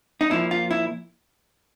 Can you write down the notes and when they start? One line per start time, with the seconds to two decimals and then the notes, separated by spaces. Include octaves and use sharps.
0.21 D#4
0.31 A#2 F3 E4
0.51 F4
0.71 E4